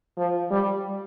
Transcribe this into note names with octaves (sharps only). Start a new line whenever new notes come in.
F3
G3